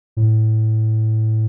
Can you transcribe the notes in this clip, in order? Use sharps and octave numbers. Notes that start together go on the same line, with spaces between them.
A2